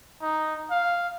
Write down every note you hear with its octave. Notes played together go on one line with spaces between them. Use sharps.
D#4
F5